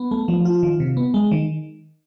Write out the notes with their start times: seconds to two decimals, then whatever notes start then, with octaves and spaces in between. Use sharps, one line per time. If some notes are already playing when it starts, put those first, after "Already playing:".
Already playing: B3
0.11 A3
0.28 F3
0.45 F4
0.63 D#3
0.80 C3
0.97 B3
1.14 G#3
1.31 D#3